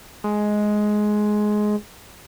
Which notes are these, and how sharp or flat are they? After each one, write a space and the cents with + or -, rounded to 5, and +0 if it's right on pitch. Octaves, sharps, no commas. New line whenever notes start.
G#3 +10